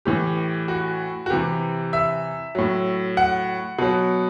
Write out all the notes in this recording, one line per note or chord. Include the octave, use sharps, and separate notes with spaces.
A2 E3 G4
F#4
F#4
C3 E3 G4
E5
A2 F#3
F#5
B2 F#3